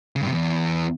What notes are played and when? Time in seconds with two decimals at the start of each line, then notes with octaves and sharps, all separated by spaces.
0.16 C#3
0.21 G2
0.26 C3
0.32 E2